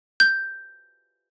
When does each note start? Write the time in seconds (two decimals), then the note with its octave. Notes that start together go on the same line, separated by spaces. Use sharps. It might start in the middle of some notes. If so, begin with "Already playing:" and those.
0.20 G6